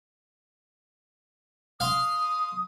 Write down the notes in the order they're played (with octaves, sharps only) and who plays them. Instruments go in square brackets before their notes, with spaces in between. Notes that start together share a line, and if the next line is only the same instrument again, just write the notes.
[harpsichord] F5 C6 [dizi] D#6